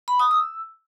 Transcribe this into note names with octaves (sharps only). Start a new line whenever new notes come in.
B5
D#6
E6